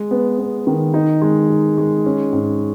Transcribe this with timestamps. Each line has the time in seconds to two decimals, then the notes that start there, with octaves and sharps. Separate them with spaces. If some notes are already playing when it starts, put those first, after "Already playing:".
Already playing: G#3
0.11 B3
0.38 B3
0.67 D#3
0.94 D#4
1.22 G#3
1.49 D#4
1.78 G#3
2.06 C#4
2.33 G#2